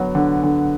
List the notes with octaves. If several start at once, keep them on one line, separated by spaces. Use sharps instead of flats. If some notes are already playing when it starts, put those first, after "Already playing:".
Already playing: D3 F#3 B3
D3
D3